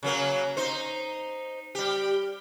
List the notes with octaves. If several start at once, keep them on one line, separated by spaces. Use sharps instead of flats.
C#3 F#3 A#3
D#4 C5
G3 G4